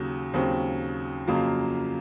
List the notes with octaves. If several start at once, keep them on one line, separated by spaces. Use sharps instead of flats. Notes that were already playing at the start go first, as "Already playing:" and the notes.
Already playing: D#2 C#3 F#3
D#2 C#3 F#3 C4
F2 C#3 F#3 A#3 F4